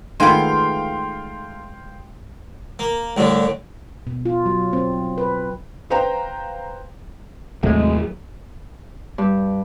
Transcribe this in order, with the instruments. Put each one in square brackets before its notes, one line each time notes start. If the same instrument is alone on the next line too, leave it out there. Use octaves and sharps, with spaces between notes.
[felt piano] D#3 A3 F4 [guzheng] G#3 B3 [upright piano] F5 G5 C6
[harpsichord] A#3
C2 A2 D3
[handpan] B2
F4
F#3
C4
B4
[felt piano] B4 C5 F5 G5 A#5
[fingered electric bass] D#2 C3 F#3 [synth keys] A2 G#3
[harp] G2